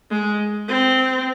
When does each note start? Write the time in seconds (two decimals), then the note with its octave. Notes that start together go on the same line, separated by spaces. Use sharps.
0.11 G#3
0.69 C4